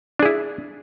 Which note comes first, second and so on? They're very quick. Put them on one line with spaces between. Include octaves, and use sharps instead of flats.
D4 G#4 E4